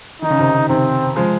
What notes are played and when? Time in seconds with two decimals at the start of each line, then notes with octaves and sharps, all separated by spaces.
0.22 D#3 D#4
0.30 C#3
0.39 C3 D#3
0.69 C3 D#3 C4
1.16 F3 G#3